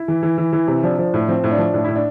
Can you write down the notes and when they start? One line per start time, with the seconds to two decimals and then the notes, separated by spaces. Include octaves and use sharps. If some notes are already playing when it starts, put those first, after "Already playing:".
Already playing: E4
0.08 E3
0.23 E3
0.38 E3
0.53 E3
0.68 C3
0.83 F3 D4
0.99 F3
1.14 A2
1.28 F3 C4
1.44 A2
1.51 D4
1.58 F3
1.74 A2 D4
1.84 A2 E4
1.95 D4